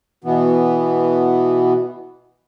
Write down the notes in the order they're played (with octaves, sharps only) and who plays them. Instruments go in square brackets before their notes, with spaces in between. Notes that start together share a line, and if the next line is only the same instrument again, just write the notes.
[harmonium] B2 E3 B3